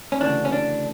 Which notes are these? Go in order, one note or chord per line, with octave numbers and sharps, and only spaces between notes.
C#4
D2 C#3 E3 D4
C#4
D4